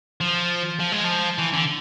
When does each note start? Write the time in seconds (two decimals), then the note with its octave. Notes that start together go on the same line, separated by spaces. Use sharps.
0.21 F3
0.80 F3
0.92 G#3
1.04 F3
1.38 E3
1.53 D3